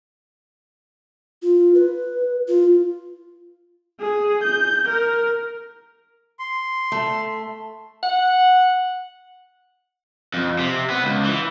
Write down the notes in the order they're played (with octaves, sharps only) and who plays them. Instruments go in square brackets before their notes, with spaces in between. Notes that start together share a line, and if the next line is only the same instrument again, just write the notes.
[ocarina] F4
B4
F4
[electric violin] G#4
G6
A#4
[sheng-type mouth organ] C6
[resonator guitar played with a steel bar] A3
[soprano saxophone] F#5
[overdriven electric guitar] F2
C3
B3
C#2
E3